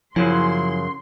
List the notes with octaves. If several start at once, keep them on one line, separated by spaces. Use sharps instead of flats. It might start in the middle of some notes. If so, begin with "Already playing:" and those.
F#2 C#3 F3 F#3 E4 C6